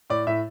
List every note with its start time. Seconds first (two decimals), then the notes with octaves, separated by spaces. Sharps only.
0.10 A2 D5
0.27 A2 E5